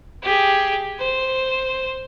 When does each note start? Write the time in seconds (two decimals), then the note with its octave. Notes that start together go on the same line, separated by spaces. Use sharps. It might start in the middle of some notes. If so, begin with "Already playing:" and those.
0.23 G4 G#4
1.00 C5